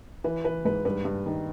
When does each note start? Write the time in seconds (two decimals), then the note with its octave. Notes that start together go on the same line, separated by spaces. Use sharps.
0.24 E3 B4
0.44 E3 B4
0.65 G#2 B4
0.85 G2 B4
1.05 G2
1.26 D#3